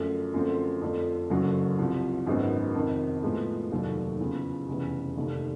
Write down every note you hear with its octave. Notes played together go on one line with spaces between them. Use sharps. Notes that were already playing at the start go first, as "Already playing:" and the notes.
Already playing: F#2 D3 F3 A3
F#2 D3 F3 A3 C4
F2 D3 F3 A3
F#1 F#2 D3 F#3
C2 C3 F3
G#1 F#2 D#3 G#3 B3
F2 C3 D#3
A2 F3 G#3 B3
F1 D#2 D3 F#3
E2 C#3 F3
F1 E2 C#3 E3
F1 D#2 D3